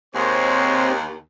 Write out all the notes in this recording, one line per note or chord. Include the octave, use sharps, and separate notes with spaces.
D#2 G#3 C4 C5 C#5 C6 C#6